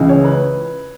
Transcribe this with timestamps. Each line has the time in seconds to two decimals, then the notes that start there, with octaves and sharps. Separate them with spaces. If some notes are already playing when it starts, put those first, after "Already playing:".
Already playing: C#2 C#3 E3
0.09 C#5
0.24 B4